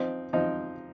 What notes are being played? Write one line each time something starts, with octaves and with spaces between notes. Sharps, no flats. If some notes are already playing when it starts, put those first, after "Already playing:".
Already playing: F3 C4 D#4
F3 C4 D#4